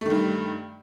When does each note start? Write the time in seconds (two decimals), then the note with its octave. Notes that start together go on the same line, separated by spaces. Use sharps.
0.01 A3
0.06 D#3
0.10 G2